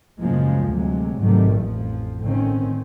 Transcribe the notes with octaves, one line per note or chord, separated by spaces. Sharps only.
F#2 A#2 C#3 F3 G#3 A#3
D2 C3 F#3 G#3
G#2 C3 D#3 F#3 G3 A3
A1 F2 F3
A2 D3 D#3 C4 C#4